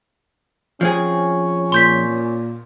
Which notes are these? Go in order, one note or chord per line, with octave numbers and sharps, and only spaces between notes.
F3 C4 C#4 G#4
A#2 C6 G6 B6